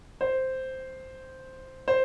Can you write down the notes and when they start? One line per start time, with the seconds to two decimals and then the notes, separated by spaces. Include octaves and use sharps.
0.21 C5
1.88 C5